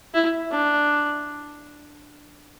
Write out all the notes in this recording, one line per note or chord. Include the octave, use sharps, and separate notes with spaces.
E4
D4